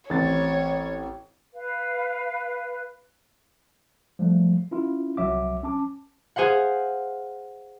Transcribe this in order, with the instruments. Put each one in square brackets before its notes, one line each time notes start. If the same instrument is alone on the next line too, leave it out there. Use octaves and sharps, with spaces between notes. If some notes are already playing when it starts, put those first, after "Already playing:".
[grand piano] A1 C4 A6 [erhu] C#5
[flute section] B4 F5
[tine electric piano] F3 G3 A3
C#4 E4 F4
C2 F#3 E5 D6
C#4 A5 D6
[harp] G#4 C5 F5 F#5